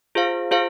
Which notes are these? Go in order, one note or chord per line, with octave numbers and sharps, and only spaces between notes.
F4 G#4 C5 F5
F4 G#4 C5 F5